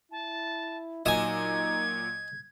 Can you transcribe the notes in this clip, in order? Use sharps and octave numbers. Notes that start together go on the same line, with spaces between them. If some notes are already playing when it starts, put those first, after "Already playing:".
E4 A5
A#2 F#3 D#4 D#5 G#5 G#6 E7